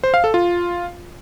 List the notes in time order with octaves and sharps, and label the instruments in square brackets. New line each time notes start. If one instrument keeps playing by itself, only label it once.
[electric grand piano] C5
F5
A4
F4